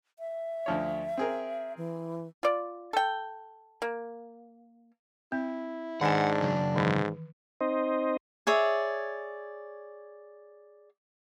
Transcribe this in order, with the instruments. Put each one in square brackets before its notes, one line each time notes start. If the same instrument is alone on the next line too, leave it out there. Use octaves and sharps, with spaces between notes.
[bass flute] E5
[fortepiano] D2 F3 C#5
C4 G#4 A#4
[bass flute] E3
[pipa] F4 D5
A4 G5
A#3
[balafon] C4 [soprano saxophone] E4
[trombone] G#2 [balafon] D#3 G#5 [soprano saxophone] D4 [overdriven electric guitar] F#5
[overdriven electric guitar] C#3 F#3
[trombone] G#2 [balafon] D#3 E3
[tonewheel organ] C4 D#4 C5 D#5
[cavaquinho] G#4 C#5 D5 E5